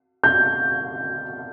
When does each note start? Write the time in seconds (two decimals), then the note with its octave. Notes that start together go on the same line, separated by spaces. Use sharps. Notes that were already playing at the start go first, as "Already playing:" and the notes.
0.24 G6